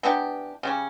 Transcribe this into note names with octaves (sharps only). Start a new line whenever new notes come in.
E3 B3 D4 G4
C#3 G3 C#4